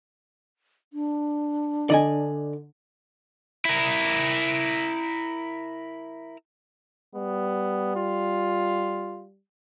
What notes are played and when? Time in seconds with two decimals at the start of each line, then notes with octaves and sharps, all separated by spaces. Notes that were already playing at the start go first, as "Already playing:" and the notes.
0.93 D4
1.90 D3 D5 D#5 G#5
3.65 E4 A#4
7.15 G3 B3
7.96 F4